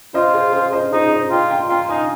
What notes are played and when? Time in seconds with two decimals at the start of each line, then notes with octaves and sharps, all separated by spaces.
0.14 F4 C5 D#5
0.34 G#4 C5
0.53 G#4 C5
0.73 C5 D#5
0.93 D#4 G#4 C5
1.12 C5 D#5
1.31 F4 D#5 G5
1.50 G5 A#5
1.69 F4 G5 A#5
1.89 D#4 F5 G#5